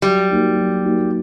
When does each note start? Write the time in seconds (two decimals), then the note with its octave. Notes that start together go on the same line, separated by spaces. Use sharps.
0.02 F#3 G3
0.30 A#3 D#4 F#4
0.56 F#3
0.83 A#3 D#4 F#4